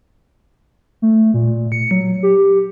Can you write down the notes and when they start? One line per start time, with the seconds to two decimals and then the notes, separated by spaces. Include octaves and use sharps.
1.02 A3
1.34 A#2
1.72 C#7
1.91 F#3
2.23 G4